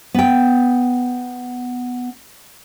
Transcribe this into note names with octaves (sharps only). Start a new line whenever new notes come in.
B3 G5